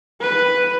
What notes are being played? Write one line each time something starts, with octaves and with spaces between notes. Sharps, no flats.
B4